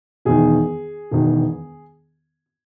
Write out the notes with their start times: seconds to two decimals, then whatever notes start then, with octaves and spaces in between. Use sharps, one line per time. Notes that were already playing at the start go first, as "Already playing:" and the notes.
0.25 E1 E2 D#3 G#4
1.11 E1 E2 D#3